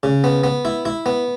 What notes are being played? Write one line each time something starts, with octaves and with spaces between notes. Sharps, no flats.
C#3
B3
B3
E4
E4
B3